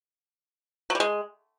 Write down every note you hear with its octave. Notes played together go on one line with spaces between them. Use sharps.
F#3
G3
G#3